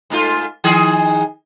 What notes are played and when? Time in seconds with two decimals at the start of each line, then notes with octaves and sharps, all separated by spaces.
0.10 G#2 A3 F4
0.64 D#3 G#4